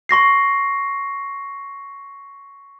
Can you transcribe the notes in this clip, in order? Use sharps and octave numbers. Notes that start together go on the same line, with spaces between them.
C6 C#6 A#6 C7